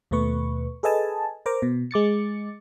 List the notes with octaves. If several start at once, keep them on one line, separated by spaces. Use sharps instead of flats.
D#2 B2 A3 B4 C#6
G#4 A4 B4 D#5 G#5 A5
A#4 C5 A#5 D6
B2
G#3 D6 A6 C#7